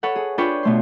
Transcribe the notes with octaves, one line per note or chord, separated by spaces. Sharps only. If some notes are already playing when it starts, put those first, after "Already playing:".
A4 B4 C#5 F#5
G#4
D4 F4 B4 C#5 G5 C#6
B2 A3 C6